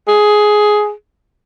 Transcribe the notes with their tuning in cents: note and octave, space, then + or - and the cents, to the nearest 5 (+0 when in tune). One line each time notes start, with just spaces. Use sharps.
G#4 +10